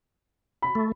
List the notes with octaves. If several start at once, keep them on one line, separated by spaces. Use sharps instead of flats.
B5
A3